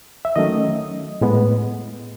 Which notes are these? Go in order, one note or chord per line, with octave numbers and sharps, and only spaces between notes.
E5
D#3 F#3 A3 C#4 D#5
A2 G#3 B3